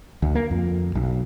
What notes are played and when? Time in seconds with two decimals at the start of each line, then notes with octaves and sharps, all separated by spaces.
0.22 D2
0.35 A#3
0.51 F2
0.95 B1